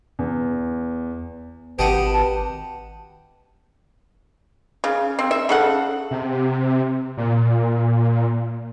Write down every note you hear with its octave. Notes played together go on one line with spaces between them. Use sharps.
E2
G#1 G4 B4 D#5 F#5 A5
C#3
C4
E5
C#3 A4 F#5
C3
A#2